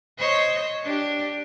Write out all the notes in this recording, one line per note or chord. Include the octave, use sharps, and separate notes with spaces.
C5 C#5 D#5
D4 G4